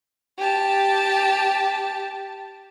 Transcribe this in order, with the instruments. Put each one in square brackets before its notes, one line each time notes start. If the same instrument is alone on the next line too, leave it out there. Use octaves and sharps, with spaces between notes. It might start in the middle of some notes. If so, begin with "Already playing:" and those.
[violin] G4 A5